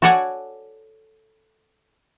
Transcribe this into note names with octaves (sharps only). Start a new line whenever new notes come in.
F#4 A4 C#5 D5 F#5 G#5